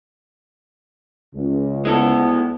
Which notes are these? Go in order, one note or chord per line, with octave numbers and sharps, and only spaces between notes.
C#2
D2 G#3 B3 E4 A4